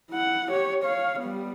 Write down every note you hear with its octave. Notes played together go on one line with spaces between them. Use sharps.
E4 F#5
G4 C#5
C#5 F5
G3 B3